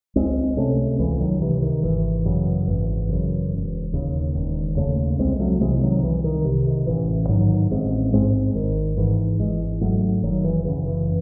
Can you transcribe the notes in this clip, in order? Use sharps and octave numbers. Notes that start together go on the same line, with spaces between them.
C#2 G#3 C4
C3 A3 C#4
C#2 E3
D#3 F#3
C3 E3
D#3
G#1 E3
F#2 C#3
G#1 E3
F#2 C#3
E1
D#2 C#3
E1 D#3
D#2 C#3 A3 C#4
C2 G#3 C4
F#3 A3
C3 E3 G#3
E3
D#3 F#3
C2 E3
D#3
C3
D#3
A1 E3
G#2 D#3 F#3
A1 G#3 C4
G#2 G#3 C4
G#1 D#3
G#2 E3
G#1 E3 G#3
G#2 F#3 A3
F#1 D#3 F#3
E3
F#2 C#3 E3
E3